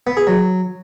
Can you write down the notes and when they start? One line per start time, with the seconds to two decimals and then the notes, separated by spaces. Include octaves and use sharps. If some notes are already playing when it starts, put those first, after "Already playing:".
0.07 B3
0.17 G#4
0.27 F#3